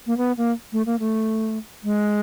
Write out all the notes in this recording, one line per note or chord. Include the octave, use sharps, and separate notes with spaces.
A#3
B3
A#3
A3
A#3
A3
G#3